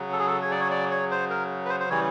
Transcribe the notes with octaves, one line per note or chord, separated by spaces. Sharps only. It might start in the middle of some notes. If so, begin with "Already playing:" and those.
Already playing: C#3 F#3
A4
G#4
A4
C#5
D5
C#5
D5
C#5
C5
A#4
B4
C5
C5
C#3 E3 G3 C#5